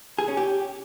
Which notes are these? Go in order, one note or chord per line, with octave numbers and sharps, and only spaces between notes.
G#4
C#4
G4